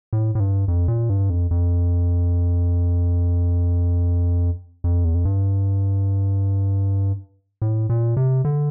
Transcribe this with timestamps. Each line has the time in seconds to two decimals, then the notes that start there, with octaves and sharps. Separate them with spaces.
0.13 A2
0.35 A2
0.40 G2
0.68 F2
0.88 A#2
1.10 G2
1.30 F2
1.51 F2
4.84 F2
5.05 E2
5.15 F2
5.25 G2
7.62 A2
7.90 A#2
8.17 C3
8.45 D3